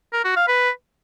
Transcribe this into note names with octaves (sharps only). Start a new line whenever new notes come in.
A#4
F#4
F5
B4